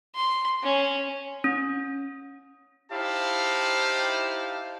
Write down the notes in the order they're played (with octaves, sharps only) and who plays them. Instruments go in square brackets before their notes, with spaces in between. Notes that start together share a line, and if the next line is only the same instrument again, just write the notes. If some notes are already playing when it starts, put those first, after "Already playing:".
[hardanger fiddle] C6
C#4
[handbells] C#4
[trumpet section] D#4 E4 G4 C5 F5 A5